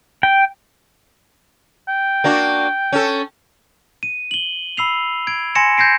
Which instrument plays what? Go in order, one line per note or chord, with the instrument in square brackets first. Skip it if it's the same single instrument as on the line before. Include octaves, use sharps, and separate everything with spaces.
[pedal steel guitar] G5
[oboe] G5
[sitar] A#3 D4 F#4
C#4 A4
[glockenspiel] D#7
F#7 G7
B5 E6 C7 F7
G#6 D7
G#5 C6 G#6 A#6 C#7 E7
G6 G#6 A#6 C7 D7